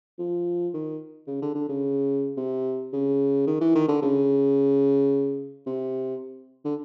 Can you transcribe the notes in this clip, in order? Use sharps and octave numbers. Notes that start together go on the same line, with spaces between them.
F3
D#3
C#3
D3
D3
C#3
C3
C#3
D#3
E3
D#3
D3
C#3
C3
D3